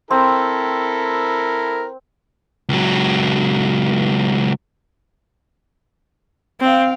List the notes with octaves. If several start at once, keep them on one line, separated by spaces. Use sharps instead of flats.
C4 E4 A4 A#4
C#2 F#3
C4 F5 G5